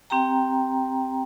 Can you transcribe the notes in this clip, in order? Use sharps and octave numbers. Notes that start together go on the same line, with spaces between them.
C4 G4 G5 A#5